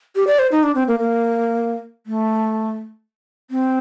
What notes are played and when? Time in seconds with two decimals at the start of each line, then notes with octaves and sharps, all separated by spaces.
0.16 G4
0.27 D5
0.39 C5
0.52 D#4
0.63 D4
0.75 C4
0.88 A#3
0.99 A#3
2.07 A3
3.51 C4